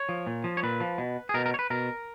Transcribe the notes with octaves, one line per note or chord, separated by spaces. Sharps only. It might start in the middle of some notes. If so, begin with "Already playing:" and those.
Already playing: C#5
F3
A#2
F3
C#5
A#2 B4
F3
B2
G#4
B2 A#4
A#4
C#5
B4
B2 A#4